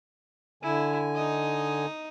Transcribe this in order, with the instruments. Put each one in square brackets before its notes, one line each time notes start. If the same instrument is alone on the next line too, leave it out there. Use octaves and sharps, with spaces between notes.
[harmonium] D3 G#5 [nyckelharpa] E4
[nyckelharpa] D#4 D#5